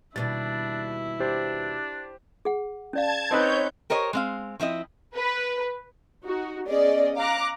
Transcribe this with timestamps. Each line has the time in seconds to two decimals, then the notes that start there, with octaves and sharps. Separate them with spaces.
0.16 D#2 B2 G3 D4 E4 A6
1.20 D4 G4 C5
2.45 G#4 F#5
2.93 C#4 D5 F5 A5 G#6
3.31 C4 D#4 B4 C#5 G6
3.90 G4 A#4 C5 C#5 D#5
4.13 G#3 C4 F5
4.60 F3 C4 E4 D#5
5.15 B4
6.25 D#4 F#4
6.68 B3 C#4 G#4 D5 D#5
7.18 F5 A#5 D6 F#6